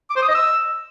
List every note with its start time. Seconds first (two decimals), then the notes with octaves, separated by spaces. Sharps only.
0.10 D6
0.16 C5
0.22 D#6
0.28 D#5
0.34 E6